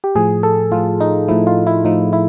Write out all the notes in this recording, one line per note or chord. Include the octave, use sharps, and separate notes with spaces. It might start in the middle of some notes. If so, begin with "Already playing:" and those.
G4
A2 F3 G#4
A4
A2 F3 F4
D#4
A2 F3 E4
F4
E4
A2 F3 D#4
E4